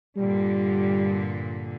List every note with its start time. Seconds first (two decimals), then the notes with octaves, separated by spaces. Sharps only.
0.17 G2 A#2 D3 G3